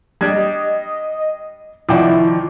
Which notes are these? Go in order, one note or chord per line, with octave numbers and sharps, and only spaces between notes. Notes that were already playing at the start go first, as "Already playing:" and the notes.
G3 D4 G4 D#5 G#6
C2 D#3 F3 E4 D5 F#5 G5 D6